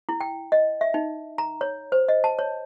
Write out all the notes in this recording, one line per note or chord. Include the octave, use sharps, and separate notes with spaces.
E4
G5
D#5
E5
D#4
A#5
C#5
C5
D#5
A5
C#5